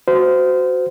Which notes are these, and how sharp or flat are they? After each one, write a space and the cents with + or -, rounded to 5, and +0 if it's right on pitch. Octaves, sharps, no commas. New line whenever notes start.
F#4 +0 C5 -25